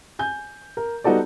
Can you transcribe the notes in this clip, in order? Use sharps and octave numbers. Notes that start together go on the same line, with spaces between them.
G#5 G6
A#4
G3 B3 D#4 F#4 A4 D5